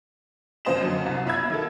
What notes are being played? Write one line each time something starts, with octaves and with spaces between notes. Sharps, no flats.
F2 C#3 C5 D#5 E7
F#2 D3
C2
B1 F4 E5 B5 E6 G#6
D#3 A4